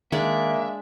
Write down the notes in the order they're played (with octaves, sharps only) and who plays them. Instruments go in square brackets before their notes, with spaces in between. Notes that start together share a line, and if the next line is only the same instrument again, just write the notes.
[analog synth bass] D#3 [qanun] G#3 D4 D5 [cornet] A#3 [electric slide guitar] E5